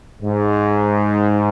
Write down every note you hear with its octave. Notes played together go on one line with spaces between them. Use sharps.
G#2